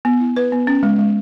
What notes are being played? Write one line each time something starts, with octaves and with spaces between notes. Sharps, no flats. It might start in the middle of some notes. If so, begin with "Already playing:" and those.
B3
E4
B4
B3
C#4
G#3
G#3